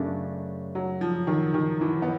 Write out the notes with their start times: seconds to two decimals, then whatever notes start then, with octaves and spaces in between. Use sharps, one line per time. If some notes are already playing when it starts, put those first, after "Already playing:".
Already playing: F#2 C#3 A3 D4
0.75 F#3
1.01 F3
1.27 D#3
1.54 D#3
1.81 E3
2.02 B3